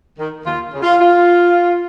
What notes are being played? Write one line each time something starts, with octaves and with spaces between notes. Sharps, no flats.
D#3
D#2 F4
C#3
F4
F4